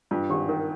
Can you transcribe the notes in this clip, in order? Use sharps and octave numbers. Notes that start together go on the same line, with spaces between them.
G2 F4
G#1 G4
D#3 A#4